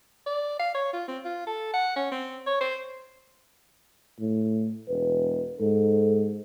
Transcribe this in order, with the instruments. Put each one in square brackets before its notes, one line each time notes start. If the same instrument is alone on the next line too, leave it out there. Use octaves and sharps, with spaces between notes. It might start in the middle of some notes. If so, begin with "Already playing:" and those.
[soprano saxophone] D5
F5
C#5
F4
C4
F4
A4
F#5
C#4
C4
C#5
C5
[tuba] A2
[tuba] E1 [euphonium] B4
[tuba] G#2 [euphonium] A4